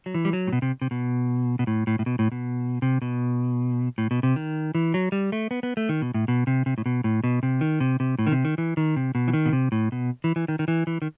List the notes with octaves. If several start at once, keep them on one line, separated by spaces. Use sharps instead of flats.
F#3
E3
G3
F#3
A2
B2
C3
C3
B2
B2
A2
A2
A2
B2
A2
B2
C3
B2
A2
B2
C3
D#3
E3
F#3
G3
A3
B3
B3
A3
D#3
B2
A2
B2
C3
C3
A2
B2
A2
B2
C3
D#3
C3
C3
A2
D#3
C3
D#3
E3
D#3
C3
B2
E3
D#3
B2
C3
A2
B2
E3
E3
D#3
D#3
E3
E3
D#3